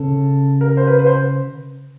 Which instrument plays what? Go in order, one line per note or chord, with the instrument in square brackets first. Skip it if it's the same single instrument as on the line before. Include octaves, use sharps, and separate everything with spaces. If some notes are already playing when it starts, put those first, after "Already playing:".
Already playing: [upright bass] C#3 [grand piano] A4
[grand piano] A#4
C5
B4
B4
C5